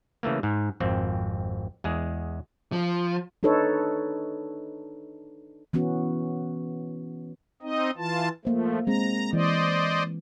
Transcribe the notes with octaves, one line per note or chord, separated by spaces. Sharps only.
C#3 E3 A3 A#3
G#2
G#1 F2 C4
E2 G#3 G#4
F3
D4 D#4 A4 B4 C#5
E3 B3 C#4 F#4
C4 D#4 D#5
E3 F4 A5
F3 A3 A#3 C5
G#3 C4 A#5
E3 C5 D5 D#5